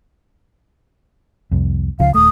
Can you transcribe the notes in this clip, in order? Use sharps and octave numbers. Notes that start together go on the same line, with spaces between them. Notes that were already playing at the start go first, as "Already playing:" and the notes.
C2 F2
C#2 C#3 F3 F5
D#1 A3 D#6